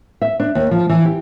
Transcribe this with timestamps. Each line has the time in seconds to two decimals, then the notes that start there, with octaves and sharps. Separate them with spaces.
0.22 E5
0.40 D4
0.55 D#2
0.71 F3
0.90 E3
1.05 G4